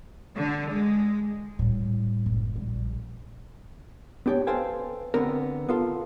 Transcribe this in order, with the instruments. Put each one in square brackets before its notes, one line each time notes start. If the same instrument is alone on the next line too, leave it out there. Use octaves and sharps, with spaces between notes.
[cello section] D3
G#3
[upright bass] A2 G3
F#1
A#1 G3
[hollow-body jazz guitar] B3 D4 G4 C#5 G5
A4 B4 C5 F5 G5 G#5
D3 B3 C4 A#4
B3 F4 A4